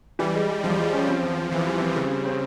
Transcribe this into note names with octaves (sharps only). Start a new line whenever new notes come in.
E3 G3
G#3
G#3
E2 F3
G#3
C#4
C4
E2
C4
E2 E3
G3
C4
C#3 G3
G3
C4